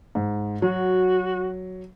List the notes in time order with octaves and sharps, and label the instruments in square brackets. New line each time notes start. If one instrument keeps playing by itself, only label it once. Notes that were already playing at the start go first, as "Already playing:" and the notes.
[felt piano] G#2
[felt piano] F#3 [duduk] F#4